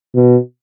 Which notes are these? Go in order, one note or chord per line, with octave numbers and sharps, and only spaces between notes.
B2